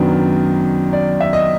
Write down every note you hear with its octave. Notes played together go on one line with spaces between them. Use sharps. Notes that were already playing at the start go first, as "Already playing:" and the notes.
Already playing: F#2 D#3 F#3 B3 D4
D5
E5
D#5